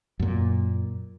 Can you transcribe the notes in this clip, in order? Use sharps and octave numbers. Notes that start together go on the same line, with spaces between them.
F#2 A#2